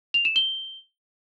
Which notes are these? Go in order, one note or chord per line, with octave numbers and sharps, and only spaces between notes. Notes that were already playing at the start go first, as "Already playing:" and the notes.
F7
E7
G7